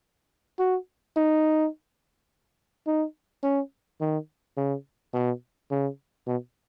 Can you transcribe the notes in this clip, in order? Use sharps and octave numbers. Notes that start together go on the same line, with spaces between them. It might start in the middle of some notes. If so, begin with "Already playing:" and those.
F#4
D#4
D#4
C#4
D#3
C#3
B2
C#3
B2